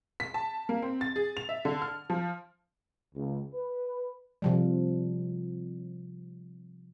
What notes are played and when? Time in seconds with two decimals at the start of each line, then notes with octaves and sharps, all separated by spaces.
0.20 B6
0.34 A5
0.69 A#3
0.82 C4
1.01 A6
1.16 G#4
1.37 F7
1.49 E5
1.65 D3
1.82 F6
2.10 F3
3.15 C#2
3.54 B4
4.42 C3 F3 G3